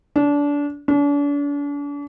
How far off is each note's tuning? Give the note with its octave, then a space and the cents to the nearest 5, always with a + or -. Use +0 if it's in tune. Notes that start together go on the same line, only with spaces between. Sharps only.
D4 -25
D4 -40